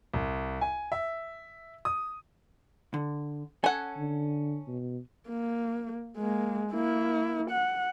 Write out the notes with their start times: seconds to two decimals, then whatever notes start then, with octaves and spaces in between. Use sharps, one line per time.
0.14 C2
0.61 G#5
0.92 E5
1.85 D#6
2.94 D3
3.64 C#4 A4 F#5 G#5
3.98 D3
4.68 B2
5.29 A#3
6.18 G#3 A#3
6.71 A#3 E4
7.51 F#5